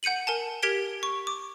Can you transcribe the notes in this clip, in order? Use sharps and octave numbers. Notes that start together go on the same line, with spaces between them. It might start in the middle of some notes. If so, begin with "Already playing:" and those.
F#5 G6 C#7 D#7 F#7
A#4 G#5 A5
G4 A#4 G#6 B6 D7 G7
C#6
D6